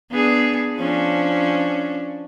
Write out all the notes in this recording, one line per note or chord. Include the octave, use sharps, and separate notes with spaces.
B3 D4 G#4
F3 C#4 D4